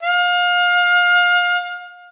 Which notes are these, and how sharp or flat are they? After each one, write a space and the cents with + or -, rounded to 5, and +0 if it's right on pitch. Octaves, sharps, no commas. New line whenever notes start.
F5 +30